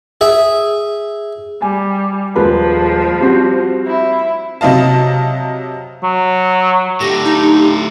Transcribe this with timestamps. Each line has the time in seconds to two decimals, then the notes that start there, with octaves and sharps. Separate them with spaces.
0.21 G#4 E5
1.62 G3 G#5
2.36 D#1 F3 G#3 B4
3.20 G3 C4 F#4
3.87 E4
4.61 C3 F#3 D#5 F5 A5
6.03 F#3
7.00 A2 D3 G4 A#6
7.25 D#4